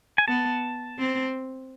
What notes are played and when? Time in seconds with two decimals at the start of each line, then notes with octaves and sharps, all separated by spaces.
0.18 G#5
0.28 B3 A5
0.99 C4